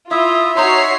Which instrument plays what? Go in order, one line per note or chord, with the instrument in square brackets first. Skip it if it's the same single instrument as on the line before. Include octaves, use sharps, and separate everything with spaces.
[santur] E4 [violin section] F4 [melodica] E5 [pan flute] D#6
[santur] D#4 C6 [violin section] F#4 C#5 C7 [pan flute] A#5